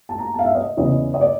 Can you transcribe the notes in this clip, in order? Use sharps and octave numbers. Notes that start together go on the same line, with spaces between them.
A5
A#5
A5
F5
E5
D#5
E2 C#3 E3 D#5
D#5
D5